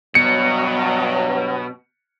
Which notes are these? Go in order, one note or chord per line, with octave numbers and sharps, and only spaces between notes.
G2 B2 F#3 C#7